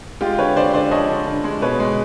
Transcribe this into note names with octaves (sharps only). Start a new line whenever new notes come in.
G#3 F4 G4
D3 B4 C#5
D3 C5 D5
D3 C5 D5
F3 C#5 D#5
D3
D3
G#3
B2 B4 C#5
G#3